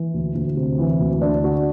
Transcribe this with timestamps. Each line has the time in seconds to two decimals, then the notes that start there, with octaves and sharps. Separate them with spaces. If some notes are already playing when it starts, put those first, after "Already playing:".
Already playing: E3
0.14 D2
0.35 D2
0.57 C3
0.79 E3
1.00 D2
1.22 D4
1.44 F#4